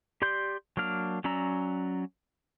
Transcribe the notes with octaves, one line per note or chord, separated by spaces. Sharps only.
G4 D5 C6 G6
F#3 A#3 D4 F6
F#3 C#4 D5 A#5 E6